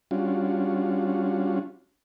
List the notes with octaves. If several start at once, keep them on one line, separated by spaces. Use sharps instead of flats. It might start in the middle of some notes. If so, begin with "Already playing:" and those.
G3 C#4 D4 F4 F#4